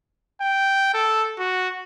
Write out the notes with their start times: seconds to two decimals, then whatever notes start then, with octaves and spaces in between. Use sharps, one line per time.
0.41 G5
0.94 A4
1.39 F#4